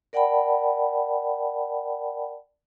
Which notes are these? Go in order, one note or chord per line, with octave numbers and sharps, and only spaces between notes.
A#4 D5 F#5 G5 A5 B5